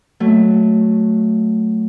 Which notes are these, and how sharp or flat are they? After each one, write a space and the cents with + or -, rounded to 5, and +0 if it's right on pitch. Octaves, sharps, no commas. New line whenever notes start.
F#3 +0 A3 +0